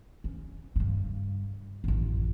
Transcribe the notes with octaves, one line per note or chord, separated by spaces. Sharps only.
C#4
G2 C#3
A1 F#2